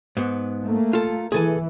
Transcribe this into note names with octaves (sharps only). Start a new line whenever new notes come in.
G#2 B3
A3 A#3
F4 A4
E3 G#4 A4 G#5